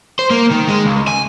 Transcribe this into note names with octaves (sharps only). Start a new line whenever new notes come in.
C5
A#3
D#3
G#3
C#2
G#5